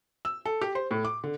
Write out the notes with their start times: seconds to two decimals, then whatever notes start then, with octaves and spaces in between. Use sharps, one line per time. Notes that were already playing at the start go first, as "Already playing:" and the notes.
0.25 E6
0.46 A4
0.62 G4
0.75 C5
0.91 A2
1.05 D6
1.24 D3